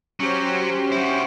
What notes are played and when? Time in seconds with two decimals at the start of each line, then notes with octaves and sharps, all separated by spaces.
0.20 F#3 C#4 G4 C5
0.92 E4 F#4